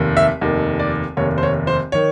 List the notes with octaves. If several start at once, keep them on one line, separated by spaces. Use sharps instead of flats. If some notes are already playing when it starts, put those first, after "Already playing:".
Already playing: F1 D#2 D#3
E5
F1 D#2 D#3
D5
F1 D#2 D#3 C#5
C5
C#5
C5
D#3 C#5